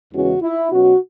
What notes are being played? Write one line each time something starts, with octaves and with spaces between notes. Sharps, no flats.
E2 C#3 E3 G#3 C#4 F#4
E4
B2 F#3 C#4 F#4